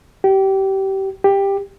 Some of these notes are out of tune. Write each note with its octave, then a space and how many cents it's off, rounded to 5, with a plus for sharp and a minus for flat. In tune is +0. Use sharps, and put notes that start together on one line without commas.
G4 -25
G4 +10